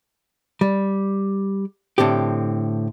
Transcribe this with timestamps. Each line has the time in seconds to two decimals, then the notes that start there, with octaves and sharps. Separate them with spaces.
0.61 G3
1.98 A2 D3 C4 G4